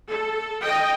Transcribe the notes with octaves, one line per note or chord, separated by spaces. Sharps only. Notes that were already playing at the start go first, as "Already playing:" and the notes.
A4
D#5 G5